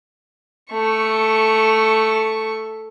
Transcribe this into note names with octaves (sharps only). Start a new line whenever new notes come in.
A3 C#6